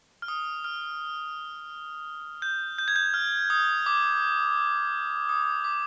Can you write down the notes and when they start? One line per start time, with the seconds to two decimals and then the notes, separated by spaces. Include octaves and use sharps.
0.22 F6
0.28 D#6
0.64 F6
2.42 G6
2.78 G6
2.88 G#6
2.96 G6
3.14 F6
3.50 D#6
3.86 D6
5.29 D#6
5.64 D6